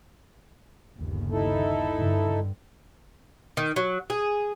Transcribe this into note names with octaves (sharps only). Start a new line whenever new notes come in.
G1 D#2 C#3
D#4 E4 A4
G2 D3
D#3
F#3
G#4